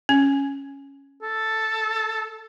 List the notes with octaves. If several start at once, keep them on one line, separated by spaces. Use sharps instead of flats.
C#4
A4